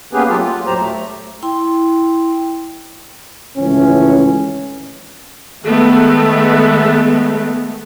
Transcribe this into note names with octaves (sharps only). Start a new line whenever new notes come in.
A#3 B3 C#4 G4 G#4 B4
F#3 A3 A#3 F4 G4 A4
F4
D#2 A2 F#3 G4 C5 A#5
A3
E4 G5 C6
G#1 C#2 A2 E3 C#4
D#3 G#3 A3 B3